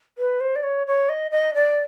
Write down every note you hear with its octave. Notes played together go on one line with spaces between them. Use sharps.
B4
C5
D5
C#5
C#5
D#5
D#5
D5